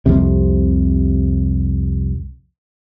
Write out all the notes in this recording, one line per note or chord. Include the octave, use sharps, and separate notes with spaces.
C2 F2 C3